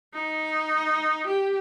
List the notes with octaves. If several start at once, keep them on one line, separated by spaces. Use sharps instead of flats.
D#4
G4